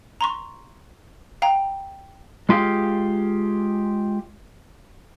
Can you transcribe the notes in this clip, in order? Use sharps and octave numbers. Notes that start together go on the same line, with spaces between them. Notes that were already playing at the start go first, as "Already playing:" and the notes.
A#5 C6 C#6
F5 G5 A#5
G#3 F4 G4 G#4 F5